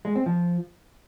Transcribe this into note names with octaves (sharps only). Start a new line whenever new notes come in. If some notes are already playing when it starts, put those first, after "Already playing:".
G#3
C4
F3